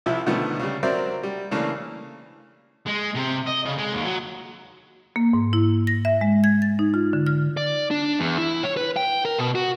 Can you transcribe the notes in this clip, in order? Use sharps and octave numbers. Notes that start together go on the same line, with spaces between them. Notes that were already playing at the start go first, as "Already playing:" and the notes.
C2 C3 F3 E4 E5
B2 D3 D#3 F3 A3 B3
C#3 G3
F#3 C4 A#4 C5 D5 E5
G3
C#3 E3 A3 A#3 D4
G#3
C3
D#5
C#3
G#3
D#2
F#3
A#3
G#2
E4
A#6
E5
G#3
G#6
A6
D#4
F4
D3
F6
D5
D4
E2
E4
C#5
B4
G5
A#4
B2
F#4